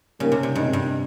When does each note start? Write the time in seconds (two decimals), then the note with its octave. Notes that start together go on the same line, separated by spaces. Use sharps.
0.20 C#3 G3 A#3 D#4 G4 A#4
0.32 C3
0.43 C3
0.55 G2 A#2 G#3 C4 D#4
0.73 G2